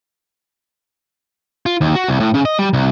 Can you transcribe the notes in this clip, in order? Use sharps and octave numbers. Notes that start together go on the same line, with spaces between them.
F4
D#2
F#4
C2
A2
C#3
D#5
G3
C2